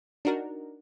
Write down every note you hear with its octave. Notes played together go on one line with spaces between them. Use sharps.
D4 D#4 F#4 A#4